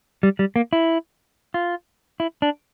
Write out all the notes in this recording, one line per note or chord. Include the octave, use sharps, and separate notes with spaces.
G3
G3
A#3
E4
F4
E4
D4